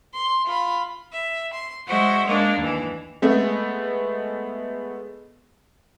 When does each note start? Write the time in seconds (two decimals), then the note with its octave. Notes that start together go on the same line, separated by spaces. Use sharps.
0.14 C6
0.46 F4 B5
1.12 E5
1.52 C6
1.87 G#3 F#4 C5 E5
2.25 G#3 A#3 D4
2.59 D#2 E3
3.22 G#3 A3 B3